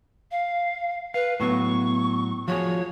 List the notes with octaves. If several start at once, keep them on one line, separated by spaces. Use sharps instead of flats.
F5
B4 F5
A2 F#3 B3 C#6
F3 F#4 G#4 C#5